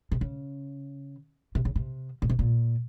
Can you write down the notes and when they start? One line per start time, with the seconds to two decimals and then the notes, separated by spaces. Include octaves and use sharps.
0.12 C3
0.21 C#3
1.55 C3
1.65 C#3
1.76 C3
2.22 A#2
2.30 C3
2.39 A#2